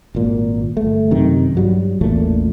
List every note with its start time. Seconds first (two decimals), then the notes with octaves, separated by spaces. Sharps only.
0.15 G#1 A#2
0.77 G1 A3
1.11 F#2 C3 D#3
1.55 G2 F#3 G3
2.01 A1 E2 A#2 A3